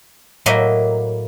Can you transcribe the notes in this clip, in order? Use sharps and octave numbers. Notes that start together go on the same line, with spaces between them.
A2 F#3 A#3 D#5 E5